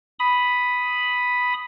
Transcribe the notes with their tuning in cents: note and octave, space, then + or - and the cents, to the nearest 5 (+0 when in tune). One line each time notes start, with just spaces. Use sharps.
B5 +0 D#6 +0